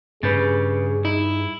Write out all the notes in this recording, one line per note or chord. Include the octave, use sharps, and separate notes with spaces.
G2 C#3 G#4 B4 G6 A6
D#4 E4